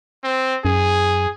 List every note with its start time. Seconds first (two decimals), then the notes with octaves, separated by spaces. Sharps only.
0.24 C4
0.65 F#2 G#4